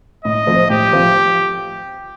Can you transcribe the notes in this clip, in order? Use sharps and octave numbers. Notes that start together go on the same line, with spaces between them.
A2 D#5
F3 A3 C4 F4
A2 G4
F3 A3 C4 F4